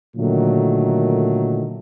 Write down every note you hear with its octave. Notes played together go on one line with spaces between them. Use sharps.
A#2 D3 D#3 F#3 A3